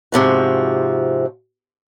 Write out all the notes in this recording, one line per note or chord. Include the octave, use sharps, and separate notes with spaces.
G#2 C3 F3 F#4